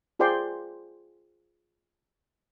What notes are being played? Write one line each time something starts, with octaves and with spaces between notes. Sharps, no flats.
F4 G#4 C5 D5 G5 C6